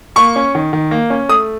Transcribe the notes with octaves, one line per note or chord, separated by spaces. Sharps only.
A#3 C#6
C#4
D#3
D#3
A#3
C#4
A3 D#6